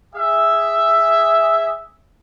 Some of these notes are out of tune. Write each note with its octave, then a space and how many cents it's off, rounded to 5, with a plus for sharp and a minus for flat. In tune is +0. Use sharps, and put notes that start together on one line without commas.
G#4 -10 E5 +0